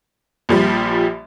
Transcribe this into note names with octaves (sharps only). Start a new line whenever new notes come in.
A#1 F3 G3